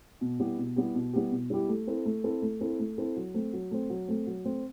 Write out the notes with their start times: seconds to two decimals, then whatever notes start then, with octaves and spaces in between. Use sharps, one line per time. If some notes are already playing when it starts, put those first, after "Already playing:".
0.21 B2
0.39 G3 B3 E4 G4
0.58 B2
0.76 G3 B3 E4 G4
0.95 B2
1.13 G3 B3 E4 G4
1.31 B2
1.50 G3 B3 E4 G4
1.69 A3
1.87 C4 E4 A4
2.05 A3
2.24 C4 E4 A4
2.42 A3
2.61 C4 E4 A4
2.79 A3
2.98 C4 E4 A4
3.16 F#3
3.34 A3 C4
3.53 F#3
3.71 A3 C4
3.90 F#3
4.08 A3 C4
4.27 F#3
4.45 A3 C4